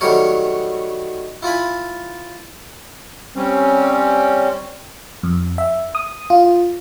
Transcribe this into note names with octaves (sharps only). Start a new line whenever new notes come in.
D#3 F#3 G3 A3 A#4 C#5
E4 F4 G#5 B5
G3 C4 C#4
F2
E5
D#6
F4